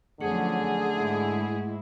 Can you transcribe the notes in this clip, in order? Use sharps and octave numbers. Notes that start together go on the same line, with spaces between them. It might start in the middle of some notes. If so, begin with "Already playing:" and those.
F2 D3 F#3 A3 C#4 G#4 F#5
G#2 G#3 E4